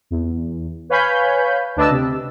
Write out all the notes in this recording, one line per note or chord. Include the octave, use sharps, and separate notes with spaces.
E2
B4 C#5 F5 G#5 B5 G6
D2 D4 B4 D#5 A5 E6
C3